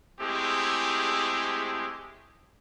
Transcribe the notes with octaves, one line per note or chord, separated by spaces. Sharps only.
G#3 A3 C4 E4 G4 G#4